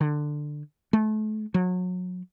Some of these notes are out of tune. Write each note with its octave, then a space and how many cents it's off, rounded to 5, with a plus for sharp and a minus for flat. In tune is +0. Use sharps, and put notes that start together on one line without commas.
D3 +15
A3 -35
F#3 -30